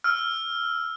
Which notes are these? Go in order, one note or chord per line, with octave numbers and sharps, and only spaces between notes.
E6 F6